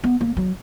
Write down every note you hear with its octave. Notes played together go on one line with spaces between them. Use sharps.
B3
A#3
F#3